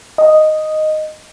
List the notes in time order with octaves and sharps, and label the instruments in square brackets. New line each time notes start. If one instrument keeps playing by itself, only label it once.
[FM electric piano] D#5